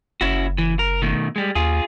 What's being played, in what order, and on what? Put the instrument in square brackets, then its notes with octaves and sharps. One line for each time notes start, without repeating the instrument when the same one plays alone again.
[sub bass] F#1 [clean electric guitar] C#4 E4 F#4
[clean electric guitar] E3
A#4
B2 D#3 A3
G3 G#3
[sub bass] D#2 [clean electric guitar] F4 G#4